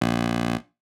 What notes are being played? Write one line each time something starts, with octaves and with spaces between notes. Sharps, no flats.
A#1